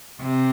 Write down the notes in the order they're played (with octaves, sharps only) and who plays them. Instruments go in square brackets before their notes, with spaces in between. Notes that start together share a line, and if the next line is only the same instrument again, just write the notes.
[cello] C3